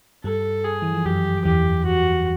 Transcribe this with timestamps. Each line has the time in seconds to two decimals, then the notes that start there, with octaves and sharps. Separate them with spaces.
0.24 G2 G3 A4
0.64 G#4
0.82 E3
0.94 F3
1.05 F#2 F#3 G4
1.45 E2 E3 G4
1.86 F#4